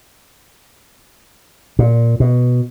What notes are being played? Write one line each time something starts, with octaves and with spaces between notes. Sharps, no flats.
A#2
B2